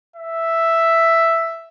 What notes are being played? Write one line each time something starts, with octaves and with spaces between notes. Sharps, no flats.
E5